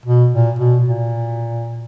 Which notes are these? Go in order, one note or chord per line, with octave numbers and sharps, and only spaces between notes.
B2
A#2
B2
A#2